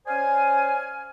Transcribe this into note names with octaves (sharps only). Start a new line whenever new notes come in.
C#4 C5 D5 F5 G#5